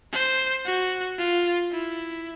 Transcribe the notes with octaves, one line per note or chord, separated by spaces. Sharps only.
C5
F#4
F4
E4